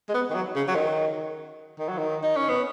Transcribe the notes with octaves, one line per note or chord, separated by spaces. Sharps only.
G#3
B3
D#3
F#3
C#3
F#3
D#3
D#3
F#3
D#3
D#4
C#4
B3